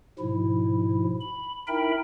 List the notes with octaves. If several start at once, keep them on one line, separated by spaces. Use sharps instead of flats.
G#2 B2 F3 E4
B5
D#4 E4 A#4 E5 G5 B5